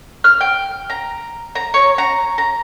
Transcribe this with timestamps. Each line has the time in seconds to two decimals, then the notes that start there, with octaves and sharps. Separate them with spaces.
0.24 F6
0.41 G5
0.90 A#5
1.55 A#5
1.74 C#5
1.98 A#5
2.38 A#5